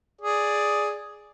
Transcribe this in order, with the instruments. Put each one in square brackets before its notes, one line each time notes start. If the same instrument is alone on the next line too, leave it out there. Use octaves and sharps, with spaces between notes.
[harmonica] G#4 D5